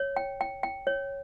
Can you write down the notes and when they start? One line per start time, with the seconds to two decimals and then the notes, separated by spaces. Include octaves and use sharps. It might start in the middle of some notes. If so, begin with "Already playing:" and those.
Already playing: C#5
0.16 G5
0.41 G5
0.63 G5
0.87 C#5